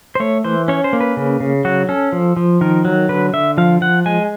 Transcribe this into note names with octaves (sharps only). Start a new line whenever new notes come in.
C5
A3 C#5
E3 C5
C#4 C#5
C5
A#3
B4
C#3
C#3
F#3 F#4
C#4 A4
F3
F3
D#3 A#4
F#3
D3 B4
D3 E5
F3 F5
F3 F#5
G#3 G#5